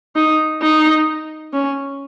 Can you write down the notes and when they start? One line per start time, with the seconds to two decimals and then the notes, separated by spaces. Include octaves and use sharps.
0.16 D#4
0.62 D#4
1.53 C#4